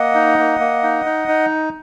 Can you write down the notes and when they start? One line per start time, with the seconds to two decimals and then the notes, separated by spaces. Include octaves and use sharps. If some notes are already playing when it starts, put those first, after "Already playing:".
Already playing: A#3 D#5 F#5
0.15 D#4
0.38 A#3
0.60 A#3
0.83 D#4
1.05 D#4
1.28 D#4